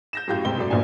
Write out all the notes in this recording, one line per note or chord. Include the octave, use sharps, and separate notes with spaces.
G6 A#6 E7
F#2 A2 G4 F5 G6
E1 A1 C3 G#3 G5 G7
F#2 A3 D5
D#1 A#1 B2 A#3 D4 G#5